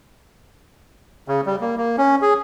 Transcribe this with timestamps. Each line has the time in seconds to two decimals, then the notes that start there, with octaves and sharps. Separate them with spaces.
1.28 C#3
1.46 G3
1.61 A#3
1.77 A#3
1.98 C#4
2.22 G#4